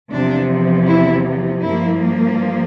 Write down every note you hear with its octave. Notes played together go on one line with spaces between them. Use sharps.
E2 C3 F3 D4
E4
G2 F3 A#3 E4